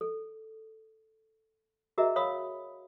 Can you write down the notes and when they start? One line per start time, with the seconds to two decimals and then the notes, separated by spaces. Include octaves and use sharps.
0.01 A4
1.98 F#4 G#4 A#4 D#5 E5 A#5
2.16 A#4 C#5 F5 B5 D#6